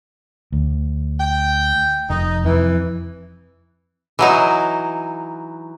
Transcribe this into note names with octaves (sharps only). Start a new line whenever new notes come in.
D2
G5
F1 D#4
F2 E3
E3 F#3 D#4